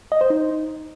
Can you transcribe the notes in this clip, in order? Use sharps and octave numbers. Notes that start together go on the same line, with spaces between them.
D#5
C5
D#4